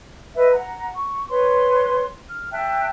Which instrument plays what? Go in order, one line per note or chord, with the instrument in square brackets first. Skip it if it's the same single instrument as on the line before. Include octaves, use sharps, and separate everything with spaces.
[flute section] B4 D#5 E5
F#5 A#5
C#6
B4 C#5 C6
F6
E5 G5 A5 F#6